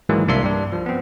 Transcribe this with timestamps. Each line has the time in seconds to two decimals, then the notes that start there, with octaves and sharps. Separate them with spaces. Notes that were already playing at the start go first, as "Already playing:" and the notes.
0.09 G#2 D#3 E3 F#3 G#3 A#3
0.28 C2 A#3 D4 E5 C6 C7
0.44 G2 D4
0.72 F3
0.86 B3 C4